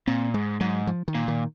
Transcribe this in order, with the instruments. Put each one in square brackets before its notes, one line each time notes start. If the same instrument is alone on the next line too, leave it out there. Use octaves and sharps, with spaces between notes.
[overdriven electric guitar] A#2 [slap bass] C4
[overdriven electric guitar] G#2 [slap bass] G#3
[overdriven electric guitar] G#2 [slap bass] F#3
[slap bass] F3
D#3
[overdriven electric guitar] A#2
[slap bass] D#3